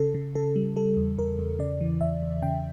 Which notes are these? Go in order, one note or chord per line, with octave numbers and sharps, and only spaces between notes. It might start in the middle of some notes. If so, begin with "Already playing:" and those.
Already playing: C#3 A4
C#3
C#3 A4
G3
G3 A4
E2
E2 A#4
E2
C#3 D5
E3
E2 E5
E2
C#3 G5